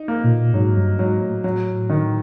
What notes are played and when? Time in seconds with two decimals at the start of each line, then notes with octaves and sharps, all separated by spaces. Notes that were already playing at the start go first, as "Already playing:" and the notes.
Already playing: D#4
0.08 A#3
0.24 A#2
0.54 G#2 F#3
0.76 G2
0.99 G#2 F#3
1.21 A2
1.44 F#3
1.90 D#3